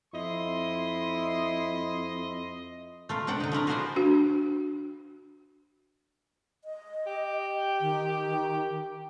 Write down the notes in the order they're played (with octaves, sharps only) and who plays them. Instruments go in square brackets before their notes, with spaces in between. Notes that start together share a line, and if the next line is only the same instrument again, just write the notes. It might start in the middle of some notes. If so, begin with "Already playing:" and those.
[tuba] F2 [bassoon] E4 [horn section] D#5 C6
[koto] A3 F4 A#4
C3 D4 F#5 G5
D3 D#4
F3 A3 E4 A#4
F4 F#4 G#4 A#4 C5 D5
[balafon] D4 F#4
[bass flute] D#5
[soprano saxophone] G4
[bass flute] D#3